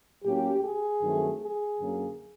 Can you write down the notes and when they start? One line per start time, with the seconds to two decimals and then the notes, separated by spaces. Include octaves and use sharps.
0.24 A2 F#3 A#3 C#4 G4
0.63 G#4
1.02 G2 D#3 F#3 A3 C4
1.41 G#4
1.79 F#2 D3 F#3 A#3 C#4